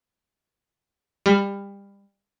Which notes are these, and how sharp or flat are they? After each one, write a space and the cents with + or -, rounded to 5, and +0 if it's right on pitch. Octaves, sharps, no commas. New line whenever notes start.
G3 +25